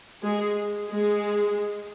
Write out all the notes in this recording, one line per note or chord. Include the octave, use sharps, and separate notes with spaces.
G#3 G#4
G#3 G#4